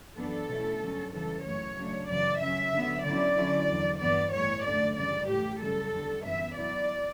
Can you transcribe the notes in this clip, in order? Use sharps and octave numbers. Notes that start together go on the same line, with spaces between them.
F#2 E3 B3 D4 A4
B2 A3 C#4 E4
G2 D3 F#3 C#4
E2 C#3 E3 G3 A4
F#2 E3 A3 C#5
C#3 F#3 A3 D4
F#2 C#3 E3 D5
C#3 F#3 C#4 E5
D3 F#3 B3
D3 F#3 C#4 E4 D5
D3 F#3 C#4 E4
E2 D3 F#3
G2 E3 B3 D5
A2 E3 G3 C#5
F#2 D3 A3 D4 D5
F#2 C#3 E3 G3 D5
A2 E3 A3 G4
F#2 C#3 G3 A4
E2 D3 G3
F#2 E3 B3 E5
B2 F#3 B3 E4 D5